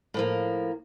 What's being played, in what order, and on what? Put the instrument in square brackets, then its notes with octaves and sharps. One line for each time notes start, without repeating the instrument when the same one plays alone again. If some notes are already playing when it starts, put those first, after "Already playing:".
[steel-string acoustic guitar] A2 F3 A#3